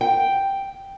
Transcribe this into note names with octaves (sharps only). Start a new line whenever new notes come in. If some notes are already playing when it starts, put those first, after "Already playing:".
G5